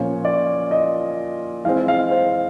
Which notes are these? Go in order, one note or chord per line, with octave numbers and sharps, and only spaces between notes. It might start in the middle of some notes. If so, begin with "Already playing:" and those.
Already playing: A#2 F3 A#3 C#4 C#5
D5
D#5
E3 G#3 C4 F5
F5
C5